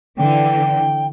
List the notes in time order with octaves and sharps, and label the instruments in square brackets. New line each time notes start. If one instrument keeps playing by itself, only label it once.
[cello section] D3 E3 [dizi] G5